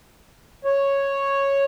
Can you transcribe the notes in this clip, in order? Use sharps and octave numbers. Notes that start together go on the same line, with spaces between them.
C#5